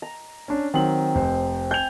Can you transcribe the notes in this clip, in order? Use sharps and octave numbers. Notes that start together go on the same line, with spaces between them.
A#5
C#4 D4
D#3 F#3 C4 F#7
F1 C5
G#5 G6 F7